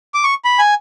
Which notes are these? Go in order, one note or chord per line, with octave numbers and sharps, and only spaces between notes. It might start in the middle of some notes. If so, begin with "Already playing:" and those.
D6
C#6
B5
G#5